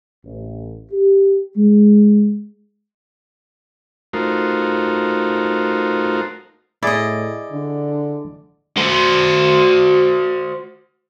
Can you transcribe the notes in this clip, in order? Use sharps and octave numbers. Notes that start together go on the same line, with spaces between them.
A1
G4
G#3
A3 D#4 F4 F#4 A#4 C5
A2 E4 G#4 D5 D#5
D3
F#4 C5